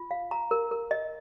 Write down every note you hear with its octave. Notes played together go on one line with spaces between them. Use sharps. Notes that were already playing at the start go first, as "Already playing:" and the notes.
Already playing: F4
F5
A#5
A#4
A#4
D#5